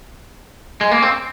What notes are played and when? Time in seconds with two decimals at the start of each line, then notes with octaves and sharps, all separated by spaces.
0.81 G#3
0.91 A#3
1.02 C4